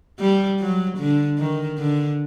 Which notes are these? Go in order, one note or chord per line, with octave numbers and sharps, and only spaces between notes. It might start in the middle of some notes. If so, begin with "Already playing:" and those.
G3
F#3
D3
D#3
D3